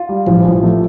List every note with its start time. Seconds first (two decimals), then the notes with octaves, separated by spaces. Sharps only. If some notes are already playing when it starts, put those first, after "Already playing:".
Already playing: F4
0.09 G3
0.27 A1 F3
0.45 A1
0.63 A3